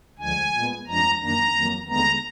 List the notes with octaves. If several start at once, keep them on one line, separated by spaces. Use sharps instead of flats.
D2 D3 F3 G#3 G#5
A#2 G#3 B3
F2 F3 G#3 D4 A#5
F#2 D#3 A#3 D4 A#5
F2 D#3 F#3 A#3
D#2 D3 G#3 B3 A#5